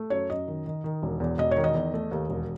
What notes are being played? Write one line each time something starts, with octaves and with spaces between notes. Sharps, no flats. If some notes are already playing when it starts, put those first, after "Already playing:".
Already playing: A3
F#2 C#5
F#2 D#5
D#3
D#3
D#3
E1
E2
E1 D#5
D#3 C#5
D#5
E2
A3
D#2
E1